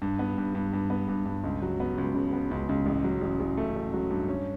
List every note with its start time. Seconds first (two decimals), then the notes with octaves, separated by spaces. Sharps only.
0.02 G2
0.19 B3
0.38 G2
0.55 G2
0.73 G2
0.90 B3
1.08 G2
1.26 G2
1.44 C#2
1.62 F#3
1.80 B3
1.98 C#2
2.15 C#3
2.33 B3
2.51 C#2
2.69 C#2
2.86 A1
3.04 F#3
3.21 A1
3.40 A1
3.57 A3
3.75 A1
3.94 F#3
4.11 G2
4.29 C#4